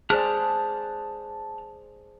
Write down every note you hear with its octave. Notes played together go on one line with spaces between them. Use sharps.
G#4 C5 D5 A5 F6 F#6